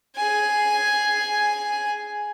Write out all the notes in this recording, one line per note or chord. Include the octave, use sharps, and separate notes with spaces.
G#4 G#5